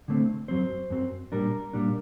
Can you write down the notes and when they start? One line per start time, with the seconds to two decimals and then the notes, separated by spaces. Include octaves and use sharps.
0.08 D3 A3 C4
0.48 F#2 F#3 C4 C5
0.90 F#2 F#3 C4
1.32 A#2 G3 D4 A#4
1.73 A#2 G3 D4